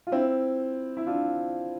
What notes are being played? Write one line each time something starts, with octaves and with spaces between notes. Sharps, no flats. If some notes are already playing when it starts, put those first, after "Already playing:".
F4
C4 E4
E4
D4 F4